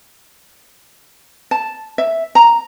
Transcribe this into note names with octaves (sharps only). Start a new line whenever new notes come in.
A5
E5
A#5